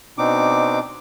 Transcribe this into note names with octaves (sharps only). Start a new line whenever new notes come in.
B2 C4 D4 D#4 D6